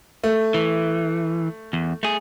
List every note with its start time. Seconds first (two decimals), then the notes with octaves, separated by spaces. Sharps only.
0.24 A3
0.54 E3
1.73 E2
2.03 A3 G#4